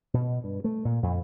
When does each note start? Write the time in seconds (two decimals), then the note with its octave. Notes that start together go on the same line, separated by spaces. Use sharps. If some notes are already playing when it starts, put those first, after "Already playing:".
0.14 B2
0.44 G2
0.64 A3
0.85 A#2
1.03 F2